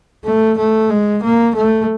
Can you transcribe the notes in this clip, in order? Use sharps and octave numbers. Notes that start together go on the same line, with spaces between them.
A3
A3
G#3
A#3
A3